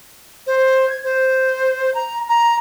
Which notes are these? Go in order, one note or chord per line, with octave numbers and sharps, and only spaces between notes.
C5
G#6
C5
A#5
A#5